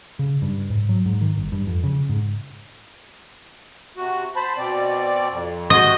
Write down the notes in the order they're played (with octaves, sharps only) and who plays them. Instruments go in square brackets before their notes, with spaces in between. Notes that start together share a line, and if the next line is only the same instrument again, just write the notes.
[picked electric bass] C#3
G2
G#2
F#3
G#2
D#3
G1
G2
F2
C#3
G#2
[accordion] C3 F#4
C5 A5 B5
B2 C4 D5
F2
[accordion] C3 F#4 G6 [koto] D#5